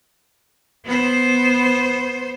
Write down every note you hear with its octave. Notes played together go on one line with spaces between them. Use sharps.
B3 C5